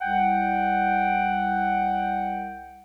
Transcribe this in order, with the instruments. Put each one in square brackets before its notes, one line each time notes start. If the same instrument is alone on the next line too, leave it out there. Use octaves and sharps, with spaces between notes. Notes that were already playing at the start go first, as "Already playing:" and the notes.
[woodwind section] C2 F#5 G5